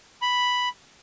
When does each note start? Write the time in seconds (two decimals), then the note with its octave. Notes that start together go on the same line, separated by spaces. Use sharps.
0.22 B5